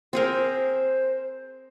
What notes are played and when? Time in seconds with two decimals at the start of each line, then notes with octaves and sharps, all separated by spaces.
0.13 C4 G#4 A#4 C5